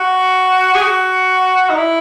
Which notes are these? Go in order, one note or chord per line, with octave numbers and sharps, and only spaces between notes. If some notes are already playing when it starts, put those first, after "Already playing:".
Already playing: F#4
G#4
F#4
D#4
E4